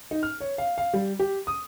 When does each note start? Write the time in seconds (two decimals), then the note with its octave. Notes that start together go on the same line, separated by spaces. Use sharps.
0.11 D#4
0.23 F6
0.40 C#5
0.58 F5
0.78 F5
0.93 G3
1.19 G4
1.47 D#6